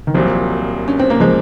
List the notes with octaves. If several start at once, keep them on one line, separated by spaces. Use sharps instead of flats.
D#3
C2 A#2 F3 F#3
C#4
C4
A#3
F3 G#3